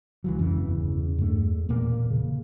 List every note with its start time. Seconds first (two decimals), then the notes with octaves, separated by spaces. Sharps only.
0.24 C#2 E3 F#3
0.39 G1 F2 C#3 E3
0.68 E2
1.18 G2 A3
1.69 E1 A#2 A#3
2.10 C#3